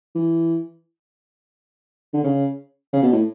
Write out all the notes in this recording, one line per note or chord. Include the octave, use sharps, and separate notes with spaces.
E3
D3
C#3
C#3
B2
A2